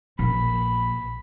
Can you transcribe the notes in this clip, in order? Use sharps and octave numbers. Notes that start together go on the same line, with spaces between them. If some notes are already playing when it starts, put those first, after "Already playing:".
A#1 B5